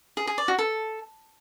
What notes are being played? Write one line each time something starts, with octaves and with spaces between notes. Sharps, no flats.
G#4
G#4
D5
F#4
A4